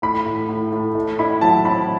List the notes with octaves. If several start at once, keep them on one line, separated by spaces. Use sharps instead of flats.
A2 B5
A2
A2
A2
A3
E4 B5
F#3 A5
C4 B5